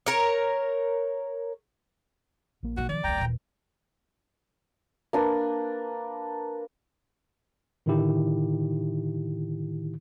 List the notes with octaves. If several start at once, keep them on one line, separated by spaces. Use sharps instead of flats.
A#4 C#5
A#1 A#3
B1 C3 F#4
C3 D#3 F3 D5
D#1 C2 A#3 G5 A#5
A#2 E3
A#3 D4 B4
A2 D3 D#3 D#4 E4 G4